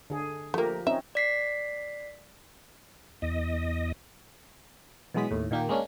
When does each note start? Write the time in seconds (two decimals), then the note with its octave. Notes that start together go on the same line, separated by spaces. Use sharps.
0.10 D3 G#4
0.54 F3 A3 A#3 G4 A#4
0.87 C4 C#4 D#4 E5
1.15 D5 B6 C7
3.22 E2 D#5
5.14 B2 E3 F#3 G#3 D#6 B6
5.31 D#2 A2
5.51 A#2 D#3 A#3 D#4 G4
5.69 G#3 A#3 C#4 D4